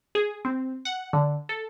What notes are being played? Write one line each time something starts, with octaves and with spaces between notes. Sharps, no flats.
G#4
C4
F#5
D3
A4